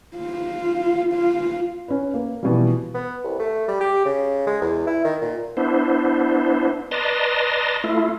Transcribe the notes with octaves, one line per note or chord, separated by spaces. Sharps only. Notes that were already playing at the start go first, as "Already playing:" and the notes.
F4
F4
C#4 B4
A#3
B2 E3 F3 G3
B3
C2
A3
G3
G4
C#3
G#3
E2
E4
D#3
A#2
B3 D4 E4 C5
B4 D5 D#5 A5 A#5 C6
A3 E4 F4